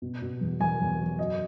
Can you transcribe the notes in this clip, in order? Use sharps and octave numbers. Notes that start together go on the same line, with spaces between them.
B2
B2
E2
E2 G#5
E2
F#3
F#2 D#5